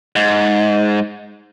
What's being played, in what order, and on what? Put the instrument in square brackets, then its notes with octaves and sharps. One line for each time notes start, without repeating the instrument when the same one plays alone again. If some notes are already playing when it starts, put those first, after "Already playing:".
[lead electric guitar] G#2